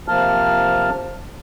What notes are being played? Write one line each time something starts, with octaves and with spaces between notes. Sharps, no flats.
C3 F3 A#3 A5 F6